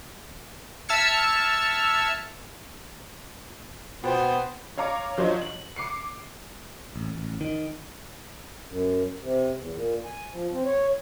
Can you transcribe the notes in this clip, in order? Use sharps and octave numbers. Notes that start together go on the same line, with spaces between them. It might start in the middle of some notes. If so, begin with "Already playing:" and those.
E5 A5 E6 F6 G#6 C#7
B2 B3 C5 G5
C#5 F5 A#5 D6 C#7
F3 F#3 D4 C5 C#5 D#5
F#7
D6 C7 C#7
A1
A1
D#3
F#2
C3
E2
A#2
G#5
F3
C4
C#5